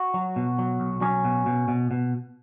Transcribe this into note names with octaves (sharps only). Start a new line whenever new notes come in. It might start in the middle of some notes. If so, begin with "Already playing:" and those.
Already playing: F#4
F#3
B2
F#3
B1
F#3 C#4
B2
B2
B2
B2